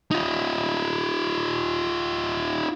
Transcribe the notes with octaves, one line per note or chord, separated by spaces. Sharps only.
D#4 F4